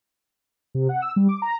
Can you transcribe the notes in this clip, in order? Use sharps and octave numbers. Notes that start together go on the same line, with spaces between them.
C3
F#5
E6
G3
D6
A#5